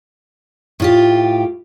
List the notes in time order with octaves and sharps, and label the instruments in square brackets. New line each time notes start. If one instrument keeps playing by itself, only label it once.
[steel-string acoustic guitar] A2 F4 G4